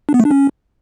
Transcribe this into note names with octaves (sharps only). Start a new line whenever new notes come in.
D4
B3
A3
D4
C#4